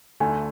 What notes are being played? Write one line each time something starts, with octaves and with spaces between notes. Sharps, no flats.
D2 D3 A3 G#5